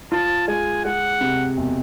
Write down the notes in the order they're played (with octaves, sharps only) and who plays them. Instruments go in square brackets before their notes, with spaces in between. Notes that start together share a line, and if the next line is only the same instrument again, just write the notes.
[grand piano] F4 [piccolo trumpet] A5
[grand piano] G#3 [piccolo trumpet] G#5
[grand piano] G#3 [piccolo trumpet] F#5
[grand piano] C3
E1